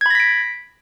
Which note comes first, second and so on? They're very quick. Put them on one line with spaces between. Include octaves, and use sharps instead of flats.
G#6 B5 A#6 B6 D7